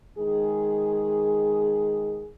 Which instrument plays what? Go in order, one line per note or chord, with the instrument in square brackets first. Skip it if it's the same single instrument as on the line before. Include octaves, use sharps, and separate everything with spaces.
[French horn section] D#3 G#3 G#4